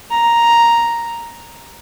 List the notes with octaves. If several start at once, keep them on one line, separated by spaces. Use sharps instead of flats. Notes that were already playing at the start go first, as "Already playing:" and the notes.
A#5